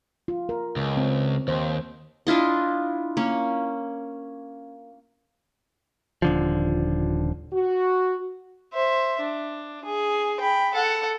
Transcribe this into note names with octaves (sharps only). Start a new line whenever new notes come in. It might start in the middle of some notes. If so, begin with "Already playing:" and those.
F4
A#4
C#2
C4
D#2 C5
D4 E4 F4 D#5
A#3 C#4
D#1 D3 F3
F#4
C5 E5
D4
G#4
G5 B5
A4 F#5